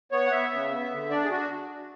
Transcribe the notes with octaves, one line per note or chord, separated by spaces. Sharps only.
B3 C#5
F#5
B3 E5
C#3
B3
D3
D4 D5
G#4
D4 F#4